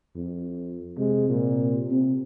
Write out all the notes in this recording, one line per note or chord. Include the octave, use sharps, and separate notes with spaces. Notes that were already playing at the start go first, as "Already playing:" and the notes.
F2
C3 G#3
A#2
C3 C4